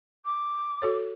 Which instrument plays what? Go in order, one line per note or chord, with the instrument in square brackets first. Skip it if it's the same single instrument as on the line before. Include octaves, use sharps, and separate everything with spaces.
[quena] D6
[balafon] F#4 A4 C#5